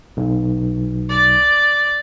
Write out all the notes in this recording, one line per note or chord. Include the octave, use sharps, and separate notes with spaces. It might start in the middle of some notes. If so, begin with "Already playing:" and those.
B1
D5